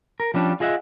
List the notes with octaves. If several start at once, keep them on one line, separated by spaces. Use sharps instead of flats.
A#4
F3 G3 C#4 D4
F4 G#4 D#5 E5 F#5